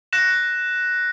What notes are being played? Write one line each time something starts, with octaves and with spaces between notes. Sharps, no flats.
F#6 A#6 E7